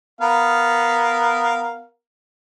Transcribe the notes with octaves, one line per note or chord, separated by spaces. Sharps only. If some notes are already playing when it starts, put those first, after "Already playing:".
B3 A#4 F5